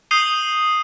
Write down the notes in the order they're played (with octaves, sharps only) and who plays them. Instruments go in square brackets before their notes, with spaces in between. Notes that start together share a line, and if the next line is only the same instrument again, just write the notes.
[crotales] D#6 G6 C7 D#7 F7 G7